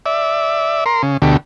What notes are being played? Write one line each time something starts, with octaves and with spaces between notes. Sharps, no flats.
D5 E5
A#4 C6
C#3
D2 B2 D3 G4